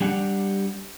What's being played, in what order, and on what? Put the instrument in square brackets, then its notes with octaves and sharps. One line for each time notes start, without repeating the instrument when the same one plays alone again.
[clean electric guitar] G3 D4 G4 F#5